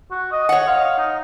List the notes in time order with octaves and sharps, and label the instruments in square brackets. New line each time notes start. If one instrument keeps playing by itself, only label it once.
[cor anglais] F#4
D#5
[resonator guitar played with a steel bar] C#5 F#5
[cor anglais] F5
D#4